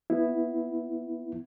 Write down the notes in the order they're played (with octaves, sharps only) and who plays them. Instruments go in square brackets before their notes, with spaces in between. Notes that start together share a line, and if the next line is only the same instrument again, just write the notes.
[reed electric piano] B3 E4